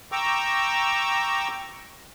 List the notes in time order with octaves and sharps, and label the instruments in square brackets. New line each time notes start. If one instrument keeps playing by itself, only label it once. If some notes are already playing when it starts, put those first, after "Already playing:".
[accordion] G5 A#5 C#6 D6 E6